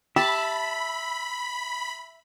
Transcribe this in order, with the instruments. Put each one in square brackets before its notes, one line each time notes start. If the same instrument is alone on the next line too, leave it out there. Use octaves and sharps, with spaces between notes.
[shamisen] G4 [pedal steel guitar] E5 [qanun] A5 [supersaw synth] B5